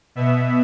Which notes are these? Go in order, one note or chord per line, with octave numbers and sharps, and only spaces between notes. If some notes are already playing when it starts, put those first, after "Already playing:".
B2 B3 E5